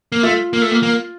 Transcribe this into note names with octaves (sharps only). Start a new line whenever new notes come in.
A#3
A3 F4
A#3
A3
A#3
A#3